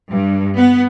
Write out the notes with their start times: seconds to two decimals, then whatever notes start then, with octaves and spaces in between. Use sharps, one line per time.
0.10 G2
0.57 B3